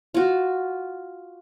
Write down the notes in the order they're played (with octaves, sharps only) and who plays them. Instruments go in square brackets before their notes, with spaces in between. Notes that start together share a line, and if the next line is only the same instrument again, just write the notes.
[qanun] F4 F#4